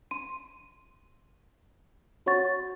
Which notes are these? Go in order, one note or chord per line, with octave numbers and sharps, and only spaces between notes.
C6 D#7
F#4 C#5 F#5 C#6 A6